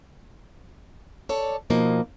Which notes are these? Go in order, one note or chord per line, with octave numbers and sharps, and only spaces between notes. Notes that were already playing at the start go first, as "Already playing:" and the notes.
A4 C#5 D5
B2 F3 A#3 D#4